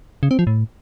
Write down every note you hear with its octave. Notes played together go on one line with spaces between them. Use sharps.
C#3
C4
F3
A2